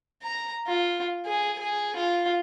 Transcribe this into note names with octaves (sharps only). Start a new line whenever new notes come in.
A#5
F4
G#4
G#4
F4